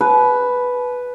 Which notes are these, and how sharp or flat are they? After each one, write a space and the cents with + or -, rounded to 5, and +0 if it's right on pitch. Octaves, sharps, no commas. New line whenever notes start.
B4 +0 A5 -40